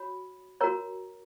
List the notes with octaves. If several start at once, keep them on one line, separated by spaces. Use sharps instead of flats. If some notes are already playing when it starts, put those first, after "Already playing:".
Already playing: F#4 C#5 B5
F#4 A#4 C#5 A#5